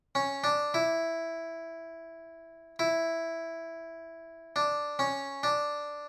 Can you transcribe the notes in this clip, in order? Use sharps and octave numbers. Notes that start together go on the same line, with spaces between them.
C#4
D4
E4
E4
D4
C#4
D4